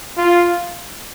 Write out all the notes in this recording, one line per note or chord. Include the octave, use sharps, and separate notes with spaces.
F4